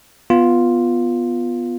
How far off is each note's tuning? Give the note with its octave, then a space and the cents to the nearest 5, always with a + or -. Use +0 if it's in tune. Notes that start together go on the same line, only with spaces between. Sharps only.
B3 +0 F4 +0